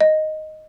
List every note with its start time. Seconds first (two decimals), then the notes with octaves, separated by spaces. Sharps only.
0.01 D#5